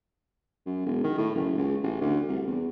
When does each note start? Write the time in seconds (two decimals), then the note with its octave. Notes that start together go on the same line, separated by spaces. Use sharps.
0.66 F#2
0.86 E1
1.04 D#3
1.18 A2
1.35 F#1
1.58 C#2
1.84 A1
2.01 D2
2.28 C2
2.47 E2